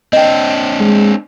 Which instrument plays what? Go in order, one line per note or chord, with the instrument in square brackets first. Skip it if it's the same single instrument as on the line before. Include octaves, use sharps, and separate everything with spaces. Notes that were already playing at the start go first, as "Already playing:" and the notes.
[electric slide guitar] C4 D4 [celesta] D#5 G5
[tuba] G#3